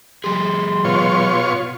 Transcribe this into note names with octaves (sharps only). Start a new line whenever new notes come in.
F#3 G4 G#4 C6
B2 F4 C#5